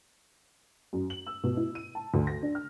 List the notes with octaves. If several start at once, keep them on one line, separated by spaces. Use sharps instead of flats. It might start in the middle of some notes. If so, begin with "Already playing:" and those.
F#2
F#7
E6
B2
E4
D#7
A5
D2
A#6
D4
F6